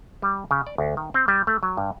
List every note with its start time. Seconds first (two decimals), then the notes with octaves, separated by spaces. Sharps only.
0.22 G3
0.51 C#3
0.67 D5
0.78 D2
0.97 D#3
1.14 C4
1.28 G3
1.47 A3
1.63 F#3
1.77 G2